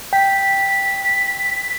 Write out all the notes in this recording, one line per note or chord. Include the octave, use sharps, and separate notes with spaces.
G5 B6